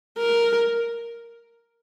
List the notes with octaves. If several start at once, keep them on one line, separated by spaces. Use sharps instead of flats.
A#4